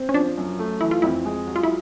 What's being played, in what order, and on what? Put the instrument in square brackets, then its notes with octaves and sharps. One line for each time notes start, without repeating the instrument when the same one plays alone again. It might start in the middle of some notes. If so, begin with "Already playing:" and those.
Already playing: [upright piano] C4
[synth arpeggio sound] C#4
[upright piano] F3 [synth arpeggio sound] D4
[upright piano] F#2
A3
[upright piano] E3 [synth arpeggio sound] E4
[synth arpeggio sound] F4
[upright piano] F2 [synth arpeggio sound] E4
[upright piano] G#3
F#3
[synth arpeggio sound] F4
E4